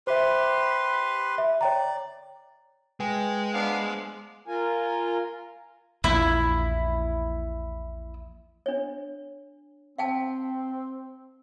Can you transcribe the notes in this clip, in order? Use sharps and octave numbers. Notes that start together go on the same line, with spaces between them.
G4 B4 C5 E5 C6
E5
C#5 D5 G5 A#5
G#3 B4 G5 G#5
B3 D4 C5 F5
F4 A#4 G#5
A#1 E2 E4
D4 C#5
C4 F5 G5 A5